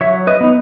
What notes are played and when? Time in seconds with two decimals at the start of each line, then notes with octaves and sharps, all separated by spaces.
0.01 F#3 C#5 E5
0.27 B4 D#5
0.41 B3 D#4